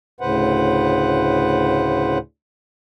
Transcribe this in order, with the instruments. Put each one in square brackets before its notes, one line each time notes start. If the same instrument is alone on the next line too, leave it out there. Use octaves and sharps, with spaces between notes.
[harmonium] D2 A2 C#3 B4 C5 F#5